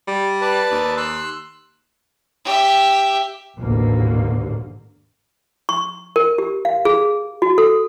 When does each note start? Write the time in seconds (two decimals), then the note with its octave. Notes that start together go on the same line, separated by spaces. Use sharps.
0.08 G3
0.41 B4 D5 A5
0.71 D#2
0.97 C6 E6 F#6
2.45 G4 E5
3.58 A1 D#2 G#2 B2 D3 A#3
5.69 C#6
6.16 A#4
6.38 G4
6.65 F5
6.85 G#4
7.42 F#4
7.58 A4